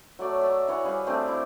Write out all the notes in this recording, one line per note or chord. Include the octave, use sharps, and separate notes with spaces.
F#3 A3 D5
E5 A5 A#5
E3 C#5 F#5
G3 G#4 B4 F5
A3 C4 D4 G4
E4